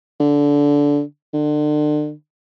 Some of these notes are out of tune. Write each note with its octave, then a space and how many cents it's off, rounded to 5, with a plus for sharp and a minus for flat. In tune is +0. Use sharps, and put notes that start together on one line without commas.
D3 -20
D3 +35